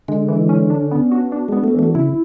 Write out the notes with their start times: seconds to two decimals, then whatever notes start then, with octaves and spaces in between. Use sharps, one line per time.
0.08 D3 G#3
0.28 E3
0.49 C#4
0.70 D4
0.91 B3
1.12 F#4
1.32 D4
1.48 G#3 B3
1.64 A3
1.74 E3 A3
1.95 C#3 E4